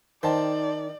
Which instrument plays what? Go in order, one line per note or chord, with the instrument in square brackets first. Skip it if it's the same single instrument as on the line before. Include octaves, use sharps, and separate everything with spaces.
[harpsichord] D#3 [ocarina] D#4 [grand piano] C5 G5 A5 [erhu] D5